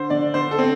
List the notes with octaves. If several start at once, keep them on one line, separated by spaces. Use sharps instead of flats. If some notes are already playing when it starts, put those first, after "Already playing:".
Already playing: D3 C5
D3 D5
D3 C5
A4
C4